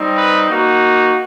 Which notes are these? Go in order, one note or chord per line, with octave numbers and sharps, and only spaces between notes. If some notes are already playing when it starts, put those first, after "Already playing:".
Already playing: G3 C4 D#4
B4
A#3 D#4 F#4